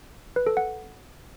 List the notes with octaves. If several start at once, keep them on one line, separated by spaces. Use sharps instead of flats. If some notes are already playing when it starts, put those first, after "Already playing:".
B4
A4
F#5